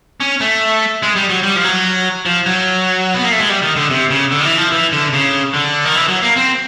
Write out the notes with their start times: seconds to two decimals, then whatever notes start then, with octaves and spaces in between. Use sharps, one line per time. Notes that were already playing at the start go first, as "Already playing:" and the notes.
0.20 C#4
0.41 A3
1.03 G#3
1.16 G3
1.30 F#3
1.43 G3
1.56 F3
1.64 F#3
2.26 F3
2.46 F#3
3.14 B3
3.23 A#3
3.32 A3
3.40 G#3
3.49 G3
3.63 D#3
3.76 D3
3.90 C3
4.11 C#3
4.31 D3
4.41 D#3
4.45 E3
4.58 F3
4.72 E3
4.93 D3
5.13 C#3
5.54 D3
5.85 D#3
5.95 E3
6.08 F#3
6.23 A#3
6.36 C4